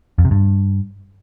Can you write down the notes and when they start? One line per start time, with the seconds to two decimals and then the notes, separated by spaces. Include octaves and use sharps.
0.18 F2
0.25 C3
0.31 G2